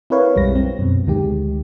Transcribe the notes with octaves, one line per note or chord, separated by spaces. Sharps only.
C4 E4 A#4 B4 C#5 F5
B1 F2 G3 G#3 C4 A#6
C4
F#2 B2
D2 D#3 G#3 G4